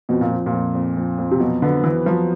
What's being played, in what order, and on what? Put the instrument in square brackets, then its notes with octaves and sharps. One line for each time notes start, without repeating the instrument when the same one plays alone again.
[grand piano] F2 [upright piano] B2
[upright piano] A#2
[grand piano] F3
[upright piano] A#2
[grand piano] F2
F2
F2
F2
[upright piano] C3
[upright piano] B2 [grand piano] F#3
[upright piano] D3 [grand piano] B3
[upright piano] E3 [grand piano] B3
[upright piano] F3 [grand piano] F#3